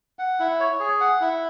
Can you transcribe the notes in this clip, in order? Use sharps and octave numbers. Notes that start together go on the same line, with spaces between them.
F#5
E4
C#5
G#4
F#5
E4